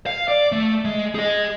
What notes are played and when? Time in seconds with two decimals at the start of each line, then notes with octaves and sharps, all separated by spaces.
0.06 F5
0.28 D5
0.52 A3
0.85 G#3
1.15 G#4 D#5